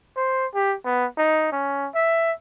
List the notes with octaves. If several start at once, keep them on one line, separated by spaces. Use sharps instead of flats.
C5
G4
B3
D#4
C#4
E5